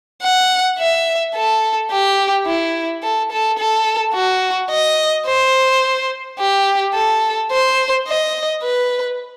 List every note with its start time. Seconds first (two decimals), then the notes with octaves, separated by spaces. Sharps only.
0.23 F#5
0.79 E5
1.36 A4
1.91 G4
2.46 E4
3.03 A4
3.32 A4
3.59 A4
4.14 F#4
4.70 D#5
5.27 C5
6.40 G4
6.95 A4
7.52 C5
8.08 D#5
8.63 B4